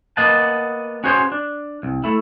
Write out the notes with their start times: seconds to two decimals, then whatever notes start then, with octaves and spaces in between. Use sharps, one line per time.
0.17 A#3 B3 D#5 F#5 A5
1.04 C#4 F#4 G#4 C5 C#5
1.32 D4
1.83 C2
2.04 A3 E4